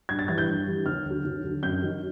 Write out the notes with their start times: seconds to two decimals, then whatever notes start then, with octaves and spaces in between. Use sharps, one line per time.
0.09 G2 G#6
0.19 A6
0.28 E3 G3 G#6
0.38 G6
0.48 G2
0.67 E3 G3
0.86 D#2 F6
1.06 D3 F#3
1.24 D#2
1.43 D3 F#3
1.63 F#2 G6
1.82 D#3 F#3